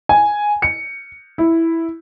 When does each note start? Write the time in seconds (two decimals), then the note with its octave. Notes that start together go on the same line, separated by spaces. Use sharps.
0.09 G#5
0.62 C#7
1.38 E4